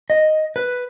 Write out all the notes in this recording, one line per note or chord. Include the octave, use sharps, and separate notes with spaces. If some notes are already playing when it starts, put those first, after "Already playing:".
D#5
B4